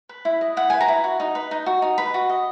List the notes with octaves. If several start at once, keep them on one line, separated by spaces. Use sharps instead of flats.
B4
E4
D#5
E4 F#5
B4 G#5
A#5
E4
F#4
D#4
B4
D#4
F#4
D#4
B4 B5
F#4
D#5